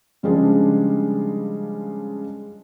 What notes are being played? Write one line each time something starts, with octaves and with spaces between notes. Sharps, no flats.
C#3 F3 G3 G#3 D4